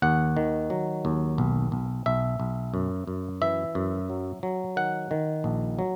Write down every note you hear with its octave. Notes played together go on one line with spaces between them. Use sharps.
D#2 F#5
D#3
F#3
D#2
B1
B1
B1 E5
B1
F#2
F#2
E3 E5
F#2
F#3
F#3
D#3 F#5
D#3
A#1
F#3